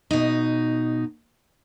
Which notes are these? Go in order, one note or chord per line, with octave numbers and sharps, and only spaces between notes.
B2 D#4